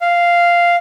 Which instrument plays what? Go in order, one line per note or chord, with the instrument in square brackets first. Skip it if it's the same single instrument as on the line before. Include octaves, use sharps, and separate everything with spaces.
[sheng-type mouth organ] F5